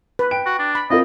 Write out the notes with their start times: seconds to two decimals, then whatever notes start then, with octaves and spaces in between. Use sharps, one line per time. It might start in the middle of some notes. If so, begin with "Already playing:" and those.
0.19 B4
0.31 G5 D7
0.46 F#4
0.59 D4
0.75 B5
0.90 C4 F4 A#4 D#5